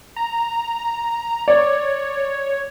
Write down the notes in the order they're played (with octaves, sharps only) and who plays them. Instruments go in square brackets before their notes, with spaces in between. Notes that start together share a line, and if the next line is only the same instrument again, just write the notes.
[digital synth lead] A#5
[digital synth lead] C#5 [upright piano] D5